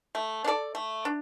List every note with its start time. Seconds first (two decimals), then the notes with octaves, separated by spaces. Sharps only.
0.15 A3
0.44 D4
0.48 A4 D5
0.75 A3
1.05 D4